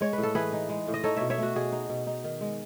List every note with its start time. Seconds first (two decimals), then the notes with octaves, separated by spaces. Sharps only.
0.01 G#3 C#5
0.13 B4
0.18 A2
0.23 A4
0.35 E3 G#4 B4
0.53 D#4
0.69 G#3
0.87 A2
0.94 D#5
1.04 D#4 A4 C#5
1.16 B2 C#5 E5
1.30 C#5 E5
1.38 A3 F#4
1.56 B2 G#4
1.72 D#4
1.89 B2
2.07 D#4
2.24 D#3
2.41 G#3